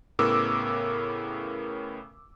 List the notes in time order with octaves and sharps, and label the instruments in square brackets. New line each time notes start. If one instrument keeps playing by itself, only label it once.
[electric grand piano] A2 C#3 B3 A#4 D6 E6